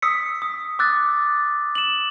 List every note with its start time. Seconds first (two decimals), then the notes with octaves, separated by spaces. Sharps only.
0.02 D#6 E6 B6 C#7
0.42 D#6
0.79 D6 E6 F#6 A6
1.75 E7 F#7